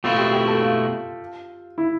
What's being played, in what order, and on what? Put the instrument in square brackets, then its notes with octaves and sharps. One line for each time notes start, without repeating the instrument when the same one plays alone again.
[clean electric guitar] B2 A3 C4 E4 [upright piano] F4
[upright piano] G4
G4
A4
F4
E4